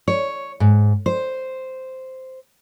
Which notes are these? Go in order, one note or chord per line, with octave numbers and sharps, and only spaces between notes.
C#5
G#2
C5